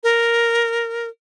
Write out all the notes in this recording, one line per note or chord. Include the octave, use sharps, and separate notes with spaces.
A#4